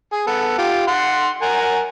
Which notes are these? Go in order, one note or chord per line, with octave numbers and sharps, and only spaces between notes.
G#4
B3 A4
F4 G4
F#5 C6
A#4 F#5 G#5